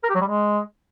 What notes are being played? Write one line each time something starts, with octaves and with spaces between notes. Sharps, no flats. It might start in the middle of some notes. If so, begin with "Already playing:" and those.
A#4
G4
F#3
G3
G#3